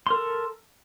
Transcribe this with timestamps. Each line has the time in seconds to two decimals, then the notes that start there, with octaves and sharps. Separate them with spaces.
0.07 C6
0.10 A#4
0.14 A4